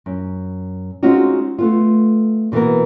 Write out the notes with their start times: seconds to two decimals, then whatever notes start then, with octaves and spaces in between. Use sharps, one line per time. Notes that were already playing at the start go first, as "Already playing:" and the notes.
0.06 F#2
1.03 G#3 C4 C#4 D#4 F4 F#4
1.58 A3 B3 F4
2.52 B2 E3 A#3 B3 A#4